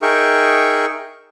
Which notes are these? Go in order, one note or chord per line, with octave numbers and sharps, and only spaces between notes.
D#4 G#4 A#4 E5 G5 C#6